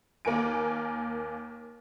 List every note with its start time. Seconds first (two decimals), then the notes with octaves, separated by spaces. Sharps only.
0.25 D#2 A#3 A#4 G#5 D7